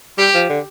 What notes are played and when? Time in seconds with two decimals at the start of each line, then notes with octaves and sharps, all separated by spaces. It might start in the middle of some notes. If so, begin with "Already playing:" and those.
0.18 G3 G4
0.34 F3
0.49 D3